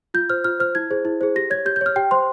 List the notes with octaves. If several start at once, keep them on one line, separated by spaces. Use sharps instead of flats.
F4 G6
C5 F6
F4 F6
C5 F6
E4 G#6
G#4 C5
E4
G#4 C5
G4 A#6
C#5 G#6
G4 G6
G6
C#5 F6
G4 G5
C5 C6